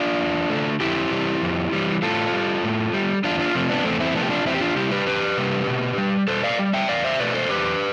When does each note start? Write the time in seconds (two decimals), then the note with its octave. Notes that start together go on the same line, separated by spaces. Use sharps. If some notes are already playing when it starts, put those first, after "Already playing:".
Already playing: D4 F4
0.20 E2
0.50 D3 A3
0.80 F2 E4 G4
1.11 E3 G3
1.42 F2
1.73 E3 G3
2.02 A2 F4 A4
2.32 G3
2.63 A2
2.93 G3
3.24 E2 D4 F4
3.39 D4 F4
3.54 C3 F3 A3
3.69 B3 D4
3.85 E2 A3 C4
4.00 C4 E4
4.15 C3 F3 A3 B3 D4
4.23 G4
4.30 D4 F4
4.46 E2 C4 E4
4.55 G4
4.61 D4 F4
4.76 C3 G3 E4 G4
4.91 G4 B4
5.07 E2 G4 B4
5.37 C3 G3
5.67 B2
5.98 G3
6.28 B2 A4 C5
6.44 D5 F5
6.59 G3
6.73 E5 G5
6.89 E2 D5 F5
7.04 C5 E5
7.20 B2 A3 B4 D5
7.34 A4 C5
7.50 E2 G4 B4